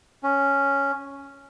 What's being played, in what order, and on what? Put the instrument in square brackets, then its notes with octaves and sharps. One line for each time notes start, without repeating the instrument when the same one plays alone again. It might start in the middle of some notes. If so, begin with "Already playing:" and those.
[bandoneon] C#4